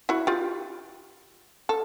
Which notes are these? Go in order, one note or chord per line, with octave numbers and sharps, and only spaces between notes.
E4 F#4
F4 G4
A4